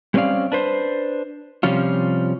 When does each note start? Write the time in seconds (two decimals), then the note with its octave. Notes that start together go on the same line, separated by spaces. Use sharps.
0.14 G3 A3 C4 C#4 D5 F5
0.52 D4 B4 C5
1.63 C3 F3 G3 C#4 F4